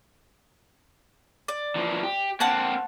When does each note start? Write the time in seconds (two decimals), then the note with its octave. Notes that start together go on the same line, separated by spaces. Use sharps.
1.48 D5
1.75 E3 F3 A#3
2.03 G4
2.40 A#3 C4 F#5 A5 F#6